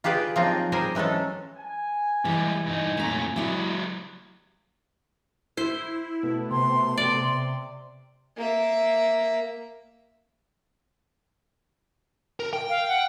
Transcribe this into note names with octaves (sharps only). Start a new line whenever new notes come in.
F4 G4 G#4 B4 D5
F3 F#3 A#3 C4 D#4 F4
G3 G#4 A#4 C5 G#5
E3 F#3 G#3 C#4 A4
G#5
E3 G3 G#3
G2 D#4
F2 A#2 A3 A#5
F#3 G#3 E4 G4 D5
E4 C5
B2 A3 B3
C3 C6
D5
A#3 E5
A#4
G5
F5
F#5